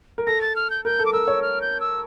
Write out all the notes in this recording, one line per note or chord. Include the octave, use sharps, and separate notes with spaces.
A#4
A4 A#6
A6
F6
G6
A#4 G6
A4
D6
A#4 E6
C#5
F6
G6
E6